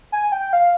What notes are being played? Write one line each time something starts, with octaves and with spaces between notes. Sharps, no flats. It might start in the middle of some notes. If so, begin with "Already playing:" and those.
G#5
G5
F5